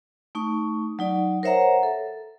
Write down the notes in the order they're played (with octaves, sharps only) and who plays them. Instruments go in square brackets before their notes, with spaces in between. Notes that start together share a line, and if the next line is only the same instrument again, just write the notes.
[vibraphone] A3 D#4 C#6
F#3 D#4 D5
A#4 C5 C#5 E5 F#5 A#5
A4